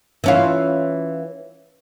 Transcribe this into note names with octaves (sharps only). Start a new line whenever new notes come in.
E3 C#4 F4